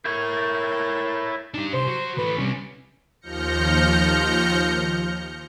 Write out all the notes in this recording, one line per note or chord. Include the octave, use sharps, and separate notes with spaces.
E4 A#4 C#5
D4 D#4 G4
C2 C5
F#3
E3 A3 B4
C3 G3 C#4
D#2 F3 F6 G6 A#6 C#7